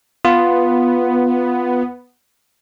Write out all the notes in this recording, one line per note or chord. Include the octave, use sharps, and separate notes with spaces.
B3 F4